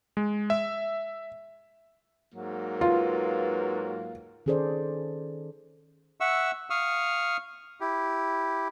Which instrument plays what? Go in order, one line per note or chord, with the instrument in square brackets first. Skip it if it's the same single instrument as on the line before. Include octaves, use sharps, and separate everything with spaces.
[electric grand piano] G#3
E5
[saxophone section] G#2 F#3 A#3
[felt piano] F4 [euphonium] B4
[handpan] D#3 C#4 G#4 A4 C5 D5
[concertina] E5 F#5 C#6 E6
F5 C#6 D#6 F6
E4 G4